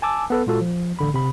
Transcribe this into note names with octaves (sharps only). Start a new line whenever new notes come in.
G#5 A5 D6 E6
B3 A4 B4
A#2 G#3 F4 F#4 A4
F3
A1 D3 B5
C3 B5